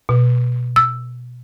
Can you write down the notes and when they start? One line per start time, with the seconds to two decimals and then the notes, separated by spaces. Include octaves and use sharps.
0.09 B2
0.76 E6